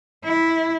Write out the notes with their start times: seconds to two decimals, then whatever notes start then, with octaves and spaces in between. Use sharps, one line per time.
0.24 E4